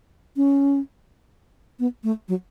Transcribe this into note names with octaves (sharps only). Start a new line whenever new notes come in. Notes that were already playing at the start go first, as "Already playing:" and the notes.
C#4
B3
A3
F#3